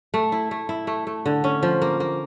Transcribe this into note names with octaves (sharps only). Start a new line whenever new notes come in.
A3
E4
A3
E4
A3
A3
D3
C#4
F3
A#3
A#3